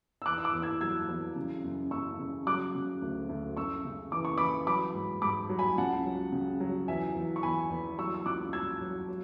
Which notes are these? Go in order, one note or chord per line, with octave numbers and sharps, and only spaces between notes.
E6
E2 D6 F#6
E6
D6 F#6
E2
E6 G#6
F#3 E6 G#6
E2
C#3
F#2
F#2 C#6 E6
C#3
F#3 D6 F#6
C#3
D2
D2
F#2 C#6 E6
C#3
E3 D6
C#6
E3 B5 D6
F#3 B5 D6
G#2
G#2 B5 D6
F#3
G#5 B5
C#2 F#5 A5
F#3
C#3
F#3
E2 E5 G#5
E2
C#6
E2 G#5 B5
E2
F#3 C#6 E6
E6
C#2 D6 F#6
F#3 E6 G#6
F#3
F#3